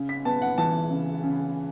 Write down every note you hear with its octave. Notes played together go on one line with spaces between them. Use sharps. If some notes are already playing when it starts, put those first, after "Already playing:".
Already playing: C#3
B6
B3 A5
F#5
E3 A5
C#3
C#3